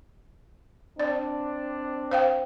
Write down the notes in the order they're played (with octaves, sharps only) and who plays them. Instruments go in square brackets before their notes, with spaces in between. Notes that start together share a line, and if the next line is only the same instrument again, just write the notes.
[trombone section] C4 D4 [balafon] D5
[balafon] C5 F5 G5